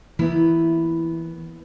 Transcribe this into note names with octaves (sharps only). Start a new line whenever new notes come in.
E3 A#3 B3 E4